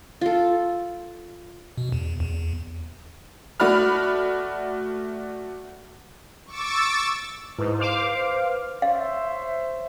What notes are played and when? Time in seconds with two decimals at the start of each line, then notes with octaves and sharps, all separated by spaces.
0.21 F4 A4
1.77 B2
1.92 E2
2.20 E2
3.60 A3 F#4 D5 B5 F6
6.46 C#6 D6 E6 A6
7.58 G#2 E4 B4
7.79 C5 F5 D6
8.02 B4
8.82 C5 C#5 E5 F5